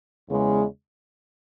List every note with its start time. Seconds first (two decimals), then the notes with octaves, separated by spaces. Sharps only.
0.28 E2 C#3 G#3